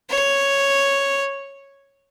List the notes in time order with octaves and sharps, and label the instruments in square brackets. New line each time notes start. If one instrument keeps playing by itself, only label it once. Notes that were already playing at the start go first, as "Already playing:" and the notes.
[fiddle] C#5